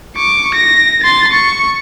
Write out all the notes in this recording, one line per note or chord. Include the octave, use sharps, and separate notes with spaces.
C#6 D6
A#6
C6 A6
C#6